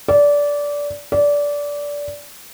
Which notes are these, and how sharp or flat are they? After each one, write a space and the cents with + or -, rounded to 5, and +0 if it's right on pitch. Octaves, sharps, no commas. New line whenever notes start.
D5 -20
D5 -20